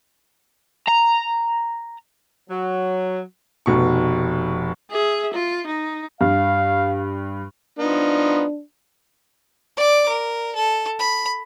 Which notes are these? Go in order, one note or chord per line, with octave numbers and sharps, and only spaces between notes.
A#5
F#3
F1 B2 C#6
G#4 E5
F4
D#4
G2 F5
F3 B3 D4 D#4
D5 D6
A#4
A4
B5